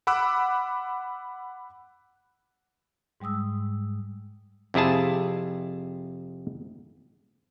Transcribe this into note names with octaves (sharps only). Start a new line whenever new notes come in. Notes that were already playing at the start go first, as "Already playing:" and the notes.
F#5 B5 D6 E6 F#6
G#2 G3 G#3 D#6 E6
F2 C3 E4 G#4 A5